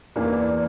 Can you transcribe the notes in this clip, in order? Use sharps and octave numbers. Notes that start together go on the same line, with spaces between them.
E2 E3 A#3 D4